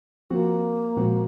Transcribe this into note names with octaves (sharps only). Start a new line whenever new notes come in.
F3 A#3 C4 F#4
A#2 F3 G#3 C4 F#4